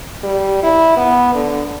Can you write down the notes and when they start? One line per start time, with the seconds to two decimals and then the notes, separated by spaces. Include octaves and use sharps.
0.23 G3
0.63 E4
0.97 B3
1.34 D3